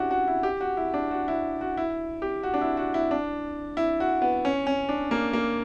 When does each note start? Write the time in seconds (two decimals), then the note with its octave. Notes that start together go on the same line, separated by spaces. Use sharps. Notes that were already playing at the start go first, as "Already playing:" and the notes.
Already playing: C#4 D4 E4 F#4 G4
0.11 F#4
0.28 E4
0.43 G4
0.61 F#4
0.77 E4
0.94 D4
1.11 F#4
1.28 E4
1.61 F#4
1.77 E4
2.22 G4
2.43 F#4
2.54 D4
2.61 E4
2.77 F#4
2.94 E4
3.11 D4
3.77 E4
4.00 F#4
4.22 B3
4.45 C#4
4.67 C#4
4.89 D4
5.11 A#3
5.33 A#3